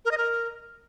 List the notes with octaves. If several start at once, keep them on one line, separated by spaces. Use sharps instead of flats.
A#4
D#5
A#4